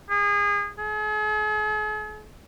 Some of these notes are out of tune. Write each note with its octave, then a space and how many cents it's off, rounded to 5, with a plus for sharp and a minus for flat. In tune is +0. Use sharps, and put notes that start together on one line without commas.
G#4 -30
G#4 +45